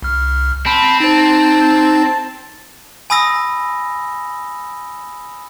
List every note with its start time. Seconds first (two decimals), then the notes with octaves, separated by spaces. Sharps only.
0.03 C2 F6
0.66 C4 A5 B5
1.00 D#4 C5 A5
3.10 G#5 B5 D#6 E6 A#6